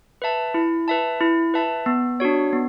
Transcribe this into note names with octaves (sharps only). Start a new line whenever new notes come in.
B4 E5 A5
E4
B4 E5 A5
E4
B4 E5 A5
B3
D4 F#4 C#5
B3